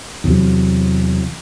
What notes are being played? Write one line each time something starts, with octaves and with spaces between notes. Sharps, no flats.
E2 C3 F#3